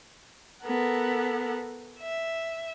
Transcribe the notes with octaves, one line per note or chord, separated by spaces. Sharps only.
B3 A4 A#4 F#5
E5